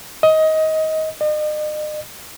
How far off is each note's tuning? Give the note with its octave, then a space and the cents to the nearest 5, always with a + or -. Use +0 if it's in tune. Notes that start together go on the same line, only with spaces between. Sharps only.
D#5 +20
D#5 -40